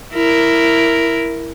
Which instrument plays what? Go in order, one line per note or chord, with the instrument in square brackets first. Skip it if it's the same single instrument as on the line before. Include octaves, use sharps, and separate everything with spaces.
[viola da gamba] E4 A#4